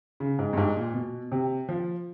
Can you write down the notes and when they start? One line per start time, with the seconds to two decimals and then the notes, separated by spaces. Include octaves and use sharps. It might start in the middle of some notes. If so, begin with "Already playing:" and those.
0.20 C#3
0.39 G#2
0.53 G2
0.57 G#2
0.76 A#2
0.94 B2
1.32 C3
1.69 F3